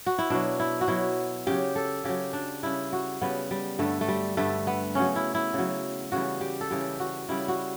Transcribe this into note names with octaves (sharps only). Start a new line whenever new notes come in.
F#4
E4
B2 F#3 D4
E4
F#4
B2 F#3 E4
C#3 F#3 G4
A4
C#3 F#3 G4
D4
C#3 G3 E4
F#4
C#3 G3 B3
G3
G2 D3 G3 A3
A3
G3
G2 D3 G3 A3
B3
C#3 F#3 C#4
E4
E4
C#3 F#3
C#3 E3 G3 F#4
G4
A4
C#3 E3 G3 G4
F#4
C#3 G3 E4
F#4